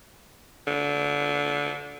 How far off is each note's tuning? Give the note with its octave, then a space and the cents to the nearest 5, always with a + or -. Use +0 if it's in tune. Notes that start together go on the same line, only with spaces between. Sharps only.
D3 -20